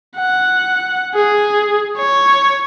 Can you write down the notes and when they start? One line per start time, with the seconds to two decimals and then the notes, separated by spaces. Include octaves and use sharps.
0.17 F#5
1.15 G#4
1.98 C#5